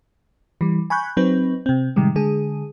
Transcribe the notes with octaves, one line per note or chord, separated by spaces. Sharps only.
E3 G3
G#5 B5 C#6 F#6 G6
F#3 C4 D#4 B4
C3 C4
A2 C3 D#3 G3 G#3
D3 G#3 G#4